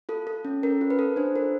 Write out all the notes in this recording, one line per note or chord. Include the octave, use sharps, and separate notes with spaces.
F4 A4
A4
C#4
C#4 A#4
F4
B4
A4
D4 C5
F4 A#4